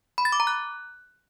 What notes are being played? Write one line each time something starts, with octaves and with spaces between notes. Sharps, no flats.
B5
A6
D6
A#5
F#6